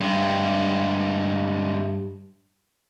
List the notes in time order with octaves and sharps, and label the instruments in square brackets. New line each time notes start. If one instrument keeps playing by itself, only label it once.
[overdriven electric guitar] D2 G#3 [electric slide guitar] G2